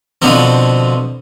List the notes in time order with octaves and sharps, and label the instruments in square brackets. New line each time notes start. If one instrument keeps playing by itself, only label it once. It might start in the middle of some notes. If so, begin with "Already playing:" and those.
[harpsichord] B2 D3 F3 C4